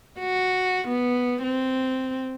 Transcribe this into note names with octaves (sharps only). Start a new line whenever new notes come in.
F#4
B3
C4